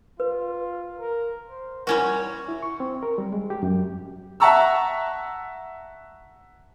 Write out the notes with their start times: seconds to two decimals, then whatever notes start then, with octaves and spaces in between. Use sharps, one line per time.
0.20 F4 B4
0.99 A#4
1.50 C5
1.87 G3 C#4 E4 F#4 A#4 F#5
2.48 E4
2.63 C#6
2.80 C4
3.03 A#4
3.18 G3
3.33 G#3
3.50 G4
3.63 F#2
4.40 E5 F#5 A5 A#5 C#6 E6